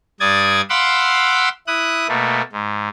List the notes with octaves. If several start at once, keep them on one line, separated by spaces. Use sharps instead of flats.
G2 D5 D#6 G#6 A6
F5 F#5 B5 C6 D6 E6
E4 D#6 F#6
B2 A3 A#3
G#2